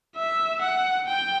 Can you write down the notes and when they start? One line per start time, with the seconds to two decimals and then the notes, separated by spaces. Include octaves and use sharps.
0.16 E5
0.61 F#5
1.07 G5